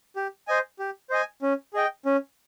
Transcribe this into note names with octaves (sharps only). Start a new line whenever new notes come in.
G4
C5 D#5 G#5
G4
C5 D#5 G#5
C#4
G#4 D#5 G5
C#4